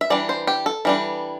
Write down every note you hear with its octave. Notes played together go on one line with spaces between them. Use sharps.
E5
E3 G3 D4 D5
C5
G4
A4
E3 G3 D4